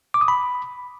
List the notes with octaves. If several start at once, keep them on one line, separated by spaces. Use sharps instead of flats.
D6
D#6
B5